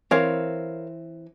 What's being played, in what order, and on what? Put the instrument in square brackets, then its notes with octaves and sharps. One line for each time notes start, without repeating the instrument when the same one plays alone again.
[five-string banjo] E3 C4 [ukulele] A#4 C#5 F5